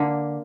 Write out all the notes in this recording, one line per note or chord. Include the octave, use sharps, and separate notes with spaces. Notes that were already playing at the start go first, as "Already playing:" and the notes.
Already playing: D3 A#3